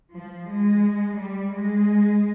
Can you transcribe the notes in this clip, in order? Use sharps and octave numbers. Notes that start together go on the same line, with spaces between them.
F3
G#3
G3
G#3